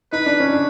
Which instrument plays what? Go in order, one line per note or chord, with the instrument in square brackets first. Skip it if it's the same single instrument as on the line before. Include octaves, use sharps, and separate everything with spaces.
[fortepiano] D#4 [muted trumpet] B4
[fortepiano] D4
C#4
D4